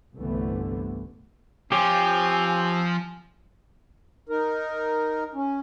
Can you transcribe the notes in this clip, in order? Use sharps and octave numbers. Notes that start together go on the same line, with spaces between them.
G1 C2 D3 E3 A3 B3
F3 C4 G4 C#5 G#5
D#4 A#4
C#4